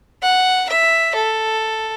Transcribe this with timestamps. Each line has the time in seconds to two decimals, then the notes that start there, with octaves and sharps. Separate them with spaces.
0.23 F#5
0.70 E5
1.16 A4